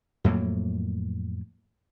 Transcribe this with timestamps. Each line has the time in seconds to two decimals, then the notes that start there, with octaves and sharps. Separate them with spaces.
0.24 F2 A2 F#3 A#3